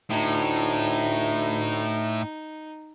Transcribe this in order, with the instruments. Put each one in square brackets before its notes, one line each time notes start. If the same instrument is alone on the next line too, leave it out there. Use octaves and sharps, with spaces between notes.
[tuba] D2 [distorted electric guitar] A2 [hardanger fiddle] D#4